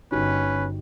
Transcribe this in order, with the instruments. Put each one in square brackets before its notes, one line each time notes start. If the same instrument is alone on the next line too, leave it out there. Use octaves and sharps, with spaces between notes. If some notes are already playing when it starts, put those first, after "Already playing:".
[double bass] G1 [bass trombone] C#4 [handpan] D#4 F#4 G4 [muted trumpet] B4